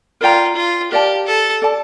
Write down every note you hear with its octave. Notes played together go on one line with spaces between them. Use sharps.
F4 A#4 D5 G5 A#5
F4
G4 A#4 D5 F5 A5
A4
A4 D5 A5